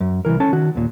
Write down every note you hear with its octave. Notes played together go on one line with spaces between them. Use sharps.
F#2
C2 A#2 E3 A#4
C#4 A4 A5
D#3 F#4
D#2 A#2